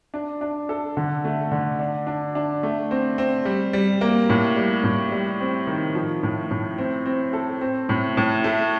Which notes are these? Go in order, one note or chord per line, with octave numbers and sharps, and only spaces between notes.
D4
D4
A4
D3
A3
D3
D4
D4
D4
A3
C4
C4
G3
G3
A#3
A2
G3
A2
G3
C4
D#3
F3
A2
A2
C4
C4
A4
C4
A2
A2
A3